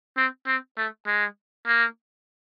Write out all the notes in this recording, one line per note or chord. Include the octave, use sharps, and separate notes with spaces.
C4
C4
A3
G#3
A#3